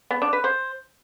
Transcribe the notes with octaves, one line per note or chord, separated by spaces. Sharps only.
B3
D4
B4
C5